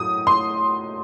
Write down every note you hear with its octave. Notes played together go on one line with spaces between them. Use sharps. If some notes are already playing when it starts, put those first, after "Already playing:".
Already playing: A2 F#3 D#6
C6